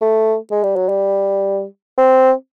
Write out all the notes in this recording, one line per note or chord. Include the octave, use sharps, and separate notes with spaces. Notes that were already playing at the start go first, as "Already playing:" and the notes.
A3
G#3
G3
F#3
G3
C4